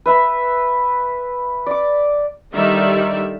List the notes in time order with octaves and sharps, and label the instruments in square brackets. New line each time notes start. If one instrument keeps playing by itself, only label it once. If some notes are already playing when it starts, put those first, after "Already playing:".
[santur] B4 E5 B5
D5 D6
[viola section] D3 D#3 G3 G4 D5 E5